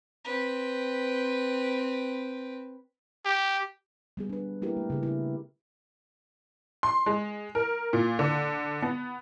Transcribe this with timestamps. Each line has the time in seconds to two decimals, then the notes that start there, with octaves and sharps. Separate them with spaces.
0.25 C4 B4
3.25 G4
4.17 G3 B3 G#4
4.29 D4 B4
4.62 A#3 E4 G4 A#4 B4
4.77 A3
4.90 C#3 G#4
5.03 B3 E4
6.83 C6
7.06 G#3
7.55 A#4
7.93 A#2
8.19 D3
8.82 B3